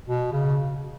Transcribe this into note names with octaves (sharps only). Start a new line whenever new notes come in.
B2
C#3